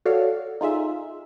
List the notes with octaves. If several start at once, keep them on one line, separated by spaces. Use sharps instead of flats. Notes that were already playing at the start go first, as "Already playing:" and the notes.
F#4 A4 C#5 D5 F5
D#4 F4 G#4 E5